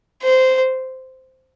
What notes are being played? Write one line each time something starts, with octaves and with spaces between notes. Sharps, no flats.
C5